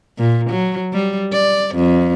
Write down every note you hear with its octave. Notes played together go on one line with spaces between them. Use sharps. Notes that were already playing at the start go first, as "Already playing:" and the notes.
A#2
F#3
G3
D5
F2